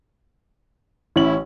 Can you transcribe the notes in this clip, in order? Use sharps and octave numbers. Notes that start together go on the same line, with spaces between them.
A1 C#4 E4 F#7